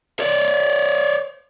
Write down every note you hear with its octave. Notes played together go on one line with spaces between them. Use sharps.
C#5 D5